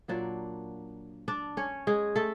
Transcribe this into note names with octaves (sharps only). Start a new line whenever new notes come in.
A#2 F#3 A#3 D4 D5
D4 D5
C#4 C#5
G#3 G#4
A3 A4